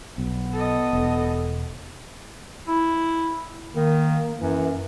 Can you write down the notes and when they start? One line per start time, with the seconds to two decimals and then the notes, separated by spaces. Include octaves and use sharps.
0.18 B1 B3
0.53 A4 D#5
0.93 E1
2.67 E4
3.76 D#3 A#3
4.41 F#2 E3